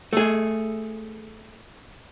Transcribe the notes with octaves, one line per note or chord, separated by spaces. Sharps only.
A3 G#4